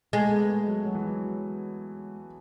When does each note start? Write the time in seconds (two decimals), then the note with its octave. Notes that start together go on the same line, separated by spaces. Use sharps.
0.13 G#3 A3
0.31 B3
0.49 A3
0.67 F#3
0.85 F#3
0.95 E3
1.05 F#3